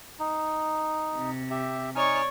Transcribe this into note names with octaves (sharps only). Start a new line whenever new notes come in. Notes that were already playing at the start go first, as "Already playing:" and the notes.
D#4
C3
G4 E5
D#4 C#5 D5 G#5 C#6 F6